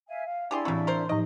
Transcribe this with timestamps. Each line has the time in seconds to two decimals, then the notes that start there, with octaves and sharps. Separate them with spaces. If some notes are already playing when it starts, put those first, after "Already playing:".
0.09 E5 F5 G#5
0.25 F5
0.51 D4 E4 G4 G#4 D5 C6
0.65 A2 C#3 E3 F#3 C4
0.87 A#4 C5
1.09 A2 F3 D#4 D#5